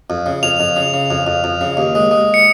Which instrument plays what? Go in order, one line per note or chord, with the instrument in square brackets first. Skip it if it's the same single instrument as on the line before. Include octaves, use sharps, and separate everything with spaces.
[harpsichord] F2
C#3
[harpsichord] F2 [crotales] F7
[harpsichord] F2
C#3
C#3
F2
F2
F2
C#3
D#2
G#3
G#3
[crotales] C#7